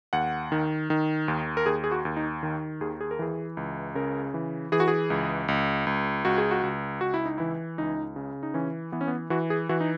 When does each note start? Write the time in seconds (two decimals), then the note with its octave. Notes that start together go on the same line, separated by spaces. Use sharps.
0.13 D#2 F#5
0.52 D#3
0.90 D#3
1.28 D#2
1.57 A#4
1.66 D#2 G#4
1.84 G#4
1.92 F#4
2.05 D#2
2.17 D#4
2.43 D#3
2.81 D#2 G#4
3.01 G#4
3.11 A#4
3.19 E3 G#4
3.57 C#2
3.95 C#3 A#4
4.34 E3
4.72 E3 G#4
4.80 F#4
4.88 G#4
5.10 C#2
5.48 C#2
5.87 C#2
6.25 C#2 F#4
6.38 G#4
6.51 F#4
6.63 C#2
7.01 C#2 F#4
7.14 E4
7.26 D#4
7.38 E3 E4
7.78 C#2 D#4
8.16 C#3
8.43 D#4
8.54 E3 C#4
8.92 E3 B3
9.01 C#4
9.07 B3
9.30 E3 F#4
9.50 G#4
9.69 E3 F#4
9.81 D#4